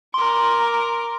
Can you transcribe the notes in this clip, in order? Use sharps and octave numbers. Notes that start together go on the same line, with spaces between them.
A#4 C6 D6